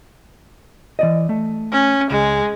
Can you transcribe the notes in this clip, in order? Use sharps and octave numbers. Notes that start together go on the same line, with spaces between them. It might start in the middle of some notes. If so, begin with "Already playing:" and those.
E3 D5 D#5
A3
C#4
C#2 G#3